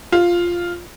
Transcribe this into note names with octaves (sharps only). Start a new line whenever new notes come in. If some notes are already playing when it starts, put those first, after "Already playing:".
F4